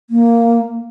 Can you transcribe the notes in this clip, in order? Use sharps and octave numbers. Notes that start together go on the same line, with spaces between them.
A#3